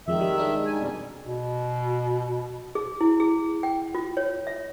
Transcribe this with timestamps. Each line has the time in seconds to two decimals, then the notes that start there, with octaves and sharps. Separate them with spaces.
0.08 F2 D#3 G#3 E5
0.21 G3
0.38 G#3 D4 D#4
0.66 D#3 G#5
0.78 F2 B2 G3
1.25 B2
2.75 G#4
3.01 E4
3.20 G#4
3.63 G5
3.95 F4
4.17 C#5
4.47 E5